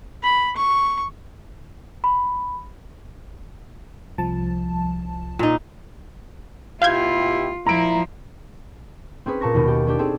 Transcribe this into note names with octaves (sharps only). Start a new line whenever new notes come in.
B5
C#6
B5
C2 F3 A5
A#2 D#4
B2 E4 F4 G4 F5 G6 G#6
A#2 F3 E4 A#5 D7
C4 C#4 G#4 B4
A#2 A5 C#6 A#6
D#2 B2
F#4 G4
C#4 D4 G4
C4 G#4 A4